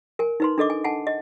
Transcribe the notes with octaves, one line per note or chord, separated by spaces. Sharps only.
A#4 G#5
D#4 B4 C6
D4 A4 D#5 D6
G#5
F#5 G#5 A5
D#5